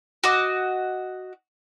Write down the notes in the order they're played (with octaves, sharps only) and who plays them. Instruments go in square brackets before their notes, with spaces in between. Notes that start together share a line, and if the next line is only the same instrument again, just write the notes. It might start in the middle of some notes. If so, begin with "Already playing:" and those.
[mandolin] F#4 D#5 D6